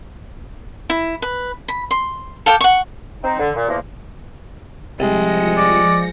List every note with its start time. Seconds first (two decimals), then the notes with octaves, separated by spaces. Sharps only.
0.90 E4
1.22 B4
1.68 B5
1.91 C6
2.46 A4 F5 G5 D6
2.61 F#5 C#6
3.23 C4 D#4
3.39 D3
3.55 A#2
3.69 E2 F3 A#3
5.00 C2 F3 G#3 A#6 C#7
5.57 D5